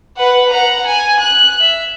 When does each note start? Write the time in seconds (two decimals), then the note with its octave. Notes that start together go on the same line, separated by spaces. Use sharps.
0.17 B4 F#5
0.49 F#5 A#5
0.86 G#5
1.19 F#6
1.60 E5